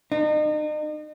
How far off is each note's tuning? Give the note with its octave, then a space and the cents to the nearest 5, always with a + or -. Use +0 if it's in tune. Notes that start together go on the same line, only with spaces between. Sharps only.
D#4 -40